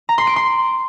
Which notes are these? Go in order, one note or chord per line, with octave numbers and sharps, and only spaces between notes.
A#5
C6
D7
C6